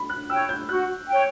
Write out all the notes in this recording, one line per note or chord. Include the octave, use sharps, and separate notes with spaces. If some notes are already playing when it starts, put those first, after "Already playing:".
Already playing: B5
F#6
C#5 G5 E6
G6
F#4 F#6
C#5 G5